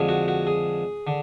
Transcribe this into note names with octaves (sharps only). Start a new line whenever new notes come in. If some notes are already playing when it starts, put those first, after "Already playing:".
Already playing: F2 D3 G#3
F#4
F#4
G#4
D3